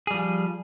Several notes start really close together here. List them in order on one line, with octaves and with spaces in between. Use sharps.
G#4 G3 F3